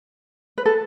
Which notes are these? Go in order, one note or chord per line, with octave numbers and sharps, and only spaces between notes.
B4
A4